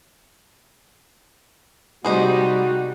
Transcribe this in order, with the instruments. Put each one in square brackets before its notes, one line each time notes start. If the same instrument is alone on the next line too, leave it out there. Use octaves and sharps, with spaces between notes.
[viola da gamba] C3 G3 D#4 [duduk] F#4 [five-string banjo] G#4 C5 D#5